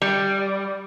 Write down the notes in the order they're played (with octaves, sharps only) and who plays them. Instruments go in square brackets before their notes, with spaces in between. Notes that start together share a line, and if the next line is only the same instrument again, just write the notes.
[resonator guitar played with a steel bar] G3